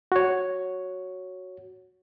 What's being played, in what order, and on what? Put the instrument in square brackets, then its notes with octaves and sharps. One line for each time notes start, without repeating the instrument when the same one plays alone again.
[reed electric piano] F#4 C#5